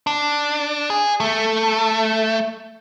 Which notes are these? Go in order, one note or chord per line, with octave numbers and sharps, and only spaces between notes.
D4
G#4
A3